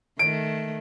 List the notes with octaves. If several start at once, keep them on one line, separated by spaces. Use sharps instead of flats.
D#3 A3 D7